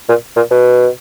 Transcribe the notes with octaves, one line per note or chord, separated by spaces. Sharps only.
A#2
A#2
B2